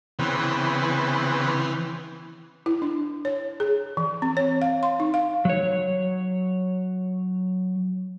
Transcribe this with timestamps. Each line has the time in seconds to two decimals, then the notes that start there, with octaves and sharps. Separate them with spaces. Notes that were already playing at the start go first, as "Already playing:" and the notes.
0.19 C#3 E3 B3 C4
2.66 E4
2.82 D4
3.25 C#5
3.60 G#4
3.97 E3
4.22 C4
4.37 C#5
4.62 F5
4.83 C6
5.00 D#4
5.14 F5
5.45 F#3 C#5